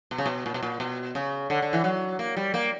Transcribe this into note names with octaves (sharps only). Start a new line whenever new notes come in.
B2
C#3
B2
A#2
B2
A#2
B2
C#3
D3
D3
E3
F#3
A#3
G3
A#3